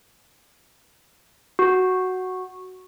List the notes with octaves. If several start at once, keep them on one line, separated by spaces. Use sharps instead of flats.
F#4